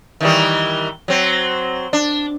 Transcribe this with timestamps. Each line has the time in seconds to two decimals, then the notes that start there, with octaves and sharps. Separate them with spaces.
0.21 D#3 E3 G3
1.08 F#3 C4
1.93 D4